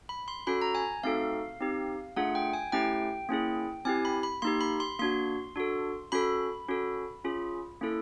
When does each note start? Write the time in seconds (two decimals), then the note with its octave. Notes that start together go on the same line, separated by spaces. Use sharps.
0.09 B5
0.28 C6
0.47 C#4 F#4 A4 B5
0.62 A#5
0.75 G#5
1.03 A3 C4 D#4 F#4 A4 F5
1.61 C4 D#4 G4
2.16 A3 D4 F4 G#4 F#5
2.35 G5
2.53 G#5
2.72 A3 C#4 E4 G4 G5
3.29 A#3 C#4 E4 G#4
3.85 C4 E4 G4 G#5
4.05 B5
4.23 B5
4.42 A#3 D#4 G4 C6
4.61 B5
4.80 C6
4.99 A#3 D4 F#4 C6
5.56 D4 F#4 A4
6.12 C#4 F#4 A4 B5
6.68 C#4 F#4 A4
7.25 C#4 F4 G#4
7.81 A#3 C#4 E4 A4